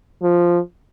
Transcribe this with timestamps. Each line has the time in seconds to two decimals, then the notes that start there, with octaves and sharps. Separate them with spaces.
0.23 F3